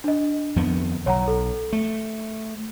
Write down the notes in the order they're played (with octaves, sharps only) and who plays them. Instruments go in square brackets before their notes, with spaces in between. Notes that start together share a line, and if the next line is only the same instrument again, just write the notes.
[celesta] D4 D#5
[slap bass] F2 D#3 B3
[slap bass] B1 [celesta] C#5 F#5 A#5
[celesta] A4
[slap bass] A3